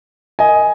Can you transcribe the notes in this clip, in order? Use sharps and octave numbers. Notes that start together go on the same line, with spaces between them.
D#5 G#5